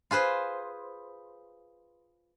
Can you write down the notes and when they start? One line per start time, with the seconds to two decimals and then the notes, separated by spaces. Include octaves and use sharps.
0.11 F4 G#4 B4 C5